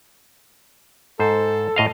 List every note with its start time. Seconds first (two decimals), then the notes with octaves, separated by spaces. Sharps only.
1.20 G#2 A4 C5
1.76 A2 D#5 F5